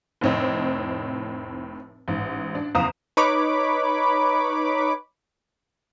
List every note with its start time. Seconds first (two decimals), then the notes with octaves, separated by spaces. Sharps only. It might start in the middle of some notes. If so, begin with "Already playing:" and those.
0.21 F1 A2 C4 C#5 D#5
2.08 A1 G#2
2.55 D4
2.75 F#1 E2 F5 A#5 D#6 E7
3.17 D#4 B4 C#5 B5 D6